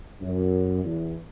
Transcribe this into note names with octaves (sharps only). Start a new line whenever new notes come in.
F#2
E2